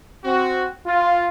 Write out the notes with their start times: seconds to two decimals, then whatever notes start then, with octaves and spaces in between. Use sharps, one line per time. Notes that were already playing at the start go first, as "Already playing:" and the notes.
0.24 C4 F#4
0.86 F4